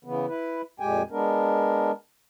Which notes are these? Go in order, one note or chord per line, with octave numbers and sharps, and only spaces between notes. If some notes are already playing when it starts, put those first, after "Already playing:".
C#3 E3 B3
E4 B4
F2 A#2 G#3 G4 G5 G#5
G#3 B3 D4 A#4